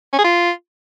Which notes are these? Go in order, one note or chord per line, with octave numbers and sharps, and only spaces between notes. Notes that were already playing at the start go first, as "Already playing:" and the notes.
C#4
G#4
F4